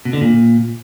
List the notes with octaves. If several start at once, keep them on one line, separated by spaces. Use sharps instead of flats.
B2
D3
A#2